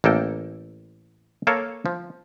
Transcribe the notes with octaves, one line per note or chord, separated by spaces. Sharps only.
A1 A#3 A4 G5
A#3 A4 A#4 C#5 F5
F3